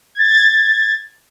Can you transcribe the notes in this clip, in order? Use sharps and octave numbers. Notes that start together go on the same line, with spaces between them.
G#6 A6